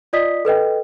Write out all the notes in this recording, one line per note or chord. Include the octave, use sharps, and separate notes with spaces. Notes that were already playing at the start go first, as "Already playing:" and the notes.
F4 D5 D#5 D#6 B6
A4 B4 D#5 G5